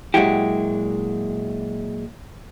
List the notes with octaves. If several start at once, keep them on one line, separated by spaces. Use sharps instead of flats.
A#2 F#3 G#3 E4 F#4 G4